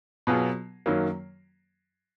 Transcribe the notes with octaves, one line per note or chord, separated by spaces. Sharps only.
B2 F#3 B3 F4 G#4
F#2 D#3 F#3 A#3